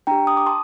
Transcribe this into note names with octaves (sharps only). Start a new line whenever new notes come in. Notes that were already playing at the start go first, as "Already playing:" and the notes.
D4 G4 G5 A#5
D#6
D6
A5 C6